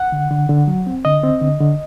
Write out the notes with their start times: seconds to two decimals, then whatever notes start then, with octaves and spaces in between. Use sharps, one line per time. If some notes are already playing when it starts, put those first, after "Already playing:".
Already playing: F#5
0.12 D3
0.31 D3
0.49 D3
0.68 F#3
0.87 C4
1.05 D3 D#5
1.23 C4
1.41 D3
1.60 D3